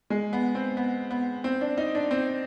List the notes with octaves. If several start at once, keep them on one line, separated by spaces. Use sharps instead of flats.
G#3
B3
C4
B3
B3
C4
D4
D#4
D4
C4